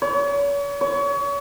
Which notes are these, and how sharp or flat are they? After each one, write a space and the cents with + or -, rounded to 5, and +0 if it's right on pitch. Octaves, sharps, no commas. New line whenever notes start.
C#5 +40
C#5 +30